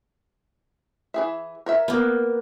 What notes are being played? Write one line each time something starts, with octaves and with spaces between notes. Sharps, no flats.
E3 G#4 E5
A#4 C#5 E5
A#3 B3